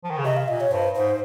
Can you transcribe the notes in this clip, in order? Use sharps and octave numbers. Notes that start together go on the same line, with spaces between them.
F3
D#3
C#3
C3 D#5
F5
A#2 D#5
C#5
G2 C5
G#2 C5